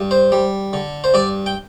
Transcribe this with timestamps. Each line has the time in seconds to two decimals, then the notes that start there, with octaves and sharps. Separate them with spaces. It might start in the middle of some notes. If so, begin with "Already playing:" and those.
Already playing: G2
0.11 C5
0.32 G3
0.73 D3
1.04 C5
1.14 G2 D5
1.46 G5